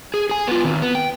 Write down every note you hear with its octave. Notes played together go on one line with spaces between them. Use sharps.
G#4
G#4 G#5
B3 F4
D#3 C4
B3
G5